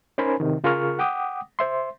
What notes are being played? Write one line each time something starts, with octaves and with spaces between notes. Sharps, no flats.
C#4 D#4 A#4 C5 G#5 B5
C3 D#3
C#3 F4 G#4 A#4 C#6 F6
F#5 G5 D6 D#6
C5 E5 C6